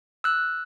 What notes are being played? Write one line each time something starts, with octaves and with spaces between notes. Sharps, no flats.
E6 F#6